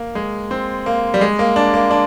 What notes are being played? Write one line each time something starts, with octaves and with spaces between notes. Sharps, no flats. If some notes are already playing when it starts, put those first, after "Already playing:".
Already playing: A#3
G#3
C4
A#3
G3
G#3
A#3
D4
A#3
D4